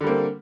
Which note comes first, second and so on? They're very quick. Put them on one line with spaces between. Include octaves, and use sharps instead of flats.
D3 G3 A#3 C4